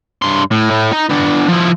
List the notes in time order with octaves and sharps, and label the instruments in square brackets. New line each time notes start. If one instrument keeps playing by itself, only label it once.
[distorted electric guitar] G2 C6
A2
A2
D#4
B3 D4
F3 E4